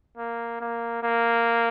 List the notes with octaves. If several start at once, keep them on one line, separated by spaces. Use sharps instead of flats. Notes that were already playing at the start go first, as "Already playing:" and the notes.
A#3
A#3
A#3